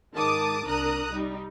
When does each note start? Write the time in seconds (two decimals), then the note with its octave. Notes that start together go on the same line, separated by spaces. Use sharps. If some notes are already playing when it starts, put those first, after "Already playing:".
0.14 G#2 D#3 G#3 A5 D6 D#6
0.65 C2 D4 A#4 A#5 D#6 F#6
1.12 G3 D#4